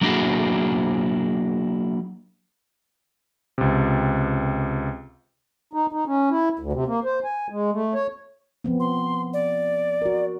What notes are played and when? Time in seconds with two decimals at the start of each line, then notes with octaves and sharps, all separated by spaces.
0.01 F#3 A#3 D4 E4 F#4 G#4
3.58 C#2 C3
5.73 D#4
5.92 D#4
6.06 C#4
6.30 E4
6.59 D2
6.73 C3
6.87 A#3
7.05 C5
7.24 G#5
7.50 G#3
7.73 A3
7.94 C#5
8.64 F3 B3 C4
8.80 C6
9.33 D5
10.02 F#4 A#4